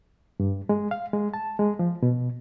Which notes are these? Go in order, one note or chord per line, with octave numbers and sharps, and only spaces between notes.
G2
G#3
F5
G#3
A5
G#3
F3
B2